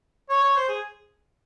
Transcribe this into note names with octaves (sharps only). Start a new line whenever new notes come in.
C#5
C#5
C5
G#4